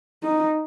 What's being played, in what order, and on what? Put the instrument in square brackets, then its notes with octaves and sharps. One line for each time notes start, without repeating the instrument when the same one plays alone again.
[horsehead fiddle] D#4